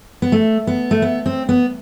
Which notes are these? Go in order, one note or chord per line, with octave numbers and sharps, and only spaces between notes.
B3
A3
B3
A3
B3
C4
B3